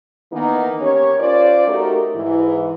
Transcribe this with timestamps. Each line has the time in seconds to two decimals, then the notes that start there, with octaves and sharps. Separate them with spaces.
0.32 D#3 E3 A#3 B3 D#4
0.81 C#4 G4 A#4 C#5
1.19 C#4 F4 C5 D5
1.67 A3 D#4 F#4 G4 A#4
2.15 G#2 E3 E4